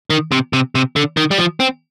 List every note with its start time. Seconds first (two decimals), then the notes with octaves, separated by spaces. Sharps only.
0.10 D#3
0.32 C3
0.53 C3
0.75 C3
0.96 D3
1.17 D#3
1.31 G3
1.38 F3
1.60 C4